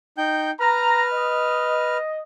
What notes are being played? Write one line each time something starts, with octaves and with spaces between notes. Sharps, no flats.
D#4 G5 G6
B4 A#5 F6
D#5